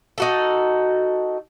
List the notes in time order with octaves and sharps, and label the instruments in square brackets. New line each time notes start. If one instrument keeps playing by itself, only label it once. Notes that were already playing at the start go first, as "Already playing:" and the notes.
[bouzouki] D#4 F#4 A4